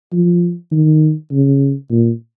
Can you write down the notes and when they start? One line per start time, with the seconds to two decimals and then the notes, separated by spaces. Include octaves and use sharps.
0.13 F3
0.72 D#3
1.32 C#3
1.91 A#2